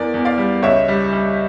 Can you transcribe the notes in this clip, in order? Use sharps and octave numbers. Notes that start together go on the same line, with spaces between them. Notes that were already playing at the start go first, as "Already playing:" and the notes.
Already playing: E2 A#4 D5
E2
D5 F5
G3
C#2 C#5 E5
G3
G3